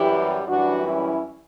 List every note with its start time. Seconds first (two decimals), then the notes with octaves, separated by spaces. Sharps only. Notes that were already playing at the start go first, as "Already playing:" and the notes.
Already playing: F#2 E3 G3 E4 G4
0.48 F#2 E3 G3 D4 F#4
0.86 C#4 E4